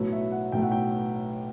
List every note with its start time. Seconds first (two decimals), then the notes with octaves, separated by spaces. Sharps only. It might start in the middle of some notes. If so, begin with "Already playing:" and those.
Already playing: B1 A2 F#3 A3 B4
0.12 E5
0.32 F#5
0.52 B1 A2 F#3 A3 G5
0.62 F#5
0.72 G5